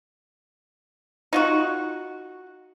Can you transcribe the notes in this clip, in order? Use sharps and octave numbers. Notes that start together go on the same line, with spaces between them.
D#4 F4 F#4